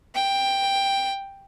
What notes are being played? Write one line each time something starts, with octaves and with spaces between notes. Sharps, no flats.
G5